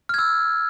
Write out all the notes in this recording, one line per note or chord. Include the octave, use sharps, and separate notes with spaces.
E6 F6 G#6